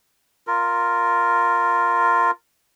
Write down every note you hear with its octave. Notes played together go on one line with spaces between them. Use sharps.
F4 A#4